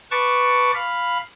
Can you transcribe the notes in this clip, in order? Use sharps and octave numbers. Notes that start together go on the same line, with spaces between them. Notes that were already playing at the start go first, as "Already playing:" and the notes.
B4 A5 C#6 D6
F5 B5